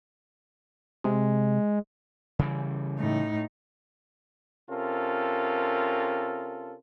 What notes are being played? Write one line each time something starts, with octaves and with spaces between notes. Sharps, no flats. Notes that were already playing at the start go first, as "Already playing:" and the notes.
C3 G#3
C#3 E3 G3
A2 D#4
C3 C#4 F4 A4 A#4